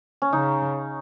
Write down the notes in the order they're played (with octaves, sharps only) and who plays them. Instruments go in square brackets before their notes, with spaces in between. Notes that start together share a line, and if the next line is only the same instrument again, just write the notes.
[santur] C#4
[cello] C#3 [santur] D#4